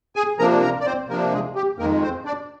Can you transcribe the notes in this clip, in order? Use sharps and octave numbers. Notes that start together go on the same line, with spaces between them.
G#4 G#5
C3 F3 A#3 D4 A#4 A#5
A#4 A#5
D5
C4 C5
C3 F3 A#3 D4 A#4
G#3 G#4
G4
F2 D#3 G#3 A#3 A#4
C4 C5
D4 D5